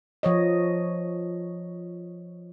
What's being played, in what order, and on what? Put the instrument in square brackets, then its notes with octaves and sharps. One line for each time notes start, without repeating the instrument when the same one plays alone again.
[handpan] F3 C#5 D#5